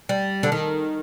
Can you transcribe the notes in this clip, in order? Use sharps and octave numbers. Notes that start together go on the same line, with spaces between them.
G3
D3
D#3